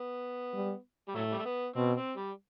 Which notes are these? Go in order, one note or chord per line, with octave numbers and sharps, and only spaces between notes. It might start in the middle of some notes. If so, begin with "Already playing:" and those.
Already playing: B3
G3
G3
A2 F#3 A3
G3
A3
B3
B2 C4
C4
G3